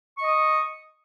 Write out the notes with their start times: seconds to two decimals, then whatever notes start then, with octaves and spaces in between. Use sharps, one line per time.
0.18 C#6
0.21 D#5
0.24 D#6